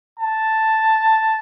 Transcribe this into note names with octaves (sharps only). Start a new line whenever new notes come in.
A5